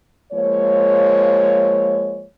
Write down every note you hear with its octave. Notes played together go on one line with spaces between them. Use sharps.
F3 G#3 A#3 C#5